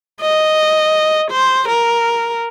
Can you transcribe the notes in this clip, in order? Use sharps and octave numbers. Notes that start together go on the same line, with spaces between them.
D#5
C5
A#4